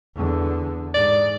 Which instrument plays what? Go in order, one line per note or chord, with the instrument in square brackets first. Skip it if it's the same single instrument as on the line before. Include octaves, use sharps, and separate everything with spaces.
[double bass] E2 D3
[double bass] G#2 [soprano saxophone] D5